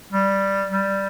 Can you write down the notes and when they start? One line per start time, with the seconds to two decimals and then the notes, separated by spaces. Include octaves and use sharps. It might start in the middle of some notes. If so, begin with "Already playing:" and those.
0.13 G3
0.71 G3